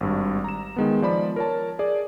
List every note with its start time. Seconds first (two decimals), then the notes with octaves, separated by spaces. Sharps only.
0.01 G#1 G2
0.44 A#5 E7
0.76 D#3 G#3 B3
1.02 F3 D5 B5
1.36 A#4 C#5 A5
1.79 G#4 D5